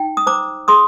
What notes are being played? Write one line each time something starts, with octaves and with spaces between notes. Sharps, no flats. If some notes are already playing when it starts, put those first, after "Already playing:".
Already playing: D#4 G5
D#6
C5 A#5 D6
G#4 C6 D#6